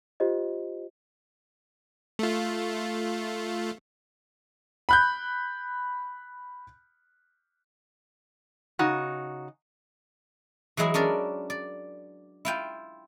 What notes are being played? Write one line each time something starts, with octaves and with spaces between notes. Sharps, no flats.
F4 G4 C5 D#5
A3 F4
B5 F#6 G6
C#3 D#4 F#4
E3 F#3 G#3 E4 G#4
C#4 D4 A#4 D5
D5
E4 F4 G5